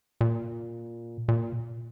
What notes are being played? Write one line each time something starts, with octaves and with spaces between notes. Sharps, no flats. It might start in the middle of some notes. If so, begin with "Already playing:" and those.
A#2
A#2